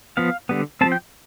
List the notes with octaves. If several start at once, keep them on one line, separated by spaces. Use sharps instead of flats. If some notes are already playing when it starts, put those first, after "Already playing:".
F3 B3 F5
D3 G3 B3
F3 A3 C4 A5
G5